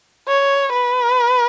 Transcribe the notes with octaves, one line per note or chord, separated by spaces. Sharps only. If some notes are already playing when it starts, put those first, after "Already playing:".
C#5
B4